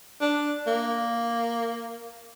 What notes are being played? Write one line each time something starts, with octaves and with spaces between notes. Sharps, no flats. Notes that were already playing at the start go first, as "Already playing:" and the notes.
D4
A#3